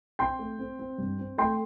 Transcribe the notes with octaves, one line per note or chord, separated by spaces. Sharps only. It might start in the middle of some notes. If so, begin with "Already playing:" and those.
C4 G5 C6
A3
C4
C4
G2
C4
A3 G5 C6